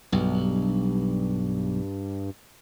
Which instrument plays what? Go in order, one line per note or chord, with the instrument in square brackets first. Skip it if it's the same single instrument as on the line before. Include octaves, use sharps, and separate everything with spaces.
[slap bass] B1 [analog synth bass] G2